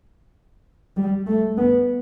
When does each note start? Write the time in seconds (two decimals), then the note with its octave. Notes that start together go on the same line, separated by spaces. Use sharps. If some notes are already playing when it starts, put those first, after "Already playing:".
0.97 G3
1.27 A3
1.58 B3